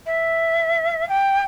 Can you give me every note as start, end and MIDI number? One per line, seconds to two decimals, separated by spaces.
0.06 1.07 76
1.09 1.45 79